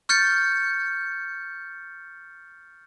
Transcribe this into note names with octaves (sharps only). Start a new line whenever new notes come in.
C#6 F6 G6 A6 C#7